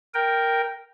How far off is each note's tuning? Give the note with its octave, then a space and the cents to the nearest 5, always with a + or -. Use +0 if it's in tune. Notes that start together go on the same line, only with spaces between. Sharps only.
A#4 +0 G5 +0